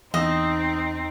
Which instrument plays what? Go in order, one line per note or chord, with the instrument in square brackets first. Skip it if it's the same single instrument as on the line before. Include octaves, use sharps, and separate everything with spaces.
[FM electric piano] E2 E6 [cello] C4 [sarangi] D#4 [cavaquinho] D#5